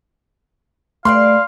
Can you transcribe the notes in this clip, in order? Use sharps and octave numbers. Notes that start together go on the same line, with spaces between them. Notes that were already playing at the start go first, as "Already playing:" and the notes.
G3 A3 B4 D5 F5 C6